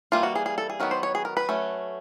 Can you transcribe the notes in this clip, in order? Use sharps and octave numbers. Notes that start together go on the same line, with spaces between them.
E3 G3 A#3 F4
F#4
G#4
G#4
A4
G#4
D#3 F#3 B3 A#4
C5
C#5
G#4
A#4
B4
F#3 A3 C#4